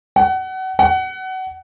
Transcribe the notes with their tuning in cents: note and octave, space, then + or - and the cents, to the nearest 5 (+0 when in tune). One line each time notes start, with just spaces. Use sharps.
F#5 +30
F#5 +25